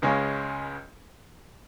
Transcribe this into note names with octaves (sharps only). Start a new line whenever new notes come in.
C#2 C#3 G#3 C#4